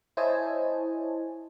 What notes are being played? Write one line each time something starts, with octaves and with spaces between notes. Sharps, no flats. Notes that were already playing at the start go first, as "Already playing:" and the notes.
E4 C5 C#5 D#5 G#5 A5